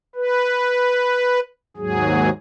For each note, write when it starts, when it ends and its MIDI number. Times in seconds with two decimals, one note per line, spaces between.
0.15 1.40 71
1.77 2.29 39
1.77 2.29 44
1.77 2.29 54
1.77 2.29 68